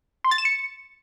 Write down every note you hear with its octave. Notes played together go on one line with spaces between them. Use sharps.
C6
A6
E7
C#7